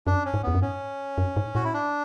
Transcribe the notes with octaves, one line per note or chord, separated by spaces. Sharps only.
F#2 D4
C#4
G#2
E2 B3
F#2
G#2 C#4
F#2
G#2
A2 F#4
E4
D4